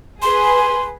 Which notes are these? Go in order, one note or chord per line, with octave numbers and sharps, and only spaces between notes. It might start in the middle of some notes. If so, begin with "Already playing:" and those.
G#4 B4 C6